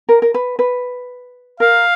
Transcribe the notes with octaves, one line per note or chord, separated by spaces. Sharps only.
A#4
A#4
B4
B4
A#4 F5